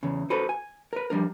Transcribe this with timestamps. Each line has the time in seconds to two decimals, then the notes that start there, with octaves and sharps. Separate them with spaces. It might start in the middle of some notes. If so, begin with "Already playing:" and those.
0.03 E2 C#3
0.30 F#4 A4 B4 C5
0.49 G#5
0.93 A#4 B4
1.10 F3 G3 D4 A#4